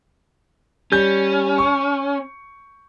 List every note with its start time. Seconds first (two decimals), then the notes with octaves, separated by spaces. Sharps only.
0.92 G3 C#4 G6
1.58 C#6